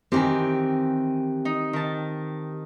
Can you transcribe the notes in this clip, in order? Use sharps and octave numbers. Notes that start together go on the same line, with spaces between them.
D#3 E3 C4 G4 G5 G#5
D#4
D#3 A5